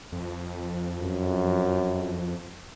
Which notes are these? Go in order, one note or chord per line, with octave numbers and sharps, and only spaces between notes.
F2
F#2